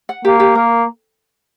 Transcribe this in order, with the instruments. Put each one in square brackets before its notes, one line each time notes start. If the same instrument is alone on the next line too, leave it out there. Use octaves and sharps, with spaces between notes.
[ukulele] F#5
[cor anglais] A#3 [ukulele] G4
[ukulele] G4
[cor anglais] A#3 [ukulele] A#4